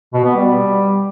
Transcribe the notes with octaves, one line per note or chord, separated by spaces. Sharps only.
B2
B3
G3